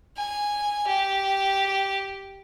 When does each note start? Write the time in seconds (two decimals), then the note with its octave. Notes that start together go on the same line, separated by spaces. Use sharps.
0.17 G#5
0.87 G4